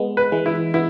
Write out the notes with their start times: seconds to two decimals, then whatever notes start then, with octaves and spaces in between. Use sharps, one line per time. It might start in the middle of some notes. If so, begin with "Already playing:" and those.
Already playing: G#3 B3
0.17 B4
0.32 E3 G#3
0.46 E4
0.74 B3 E4